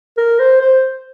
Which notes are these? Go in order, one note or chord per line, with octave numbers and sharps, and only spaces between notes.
A#4
C5
C5